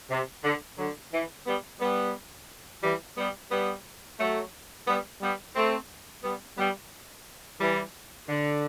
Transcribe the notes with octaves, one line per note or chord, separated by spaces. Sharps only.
C3
D3
D3 F#3
E3
G3 B3
G3 B3
E3 G3
G3 B3
G3 B3
F#3 A3
G3 B3
G3 B3
A3 C4
G3 B3
G3 B3
E3 G3
D3